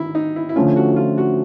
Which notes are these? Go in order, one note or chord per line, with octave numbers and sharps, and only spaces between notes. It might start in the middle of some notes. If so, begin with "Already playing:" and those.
Already playing: D#3 E4
D#4
E4
E4
D3 F3 A3 C#4 F4
F#4
F4
F#4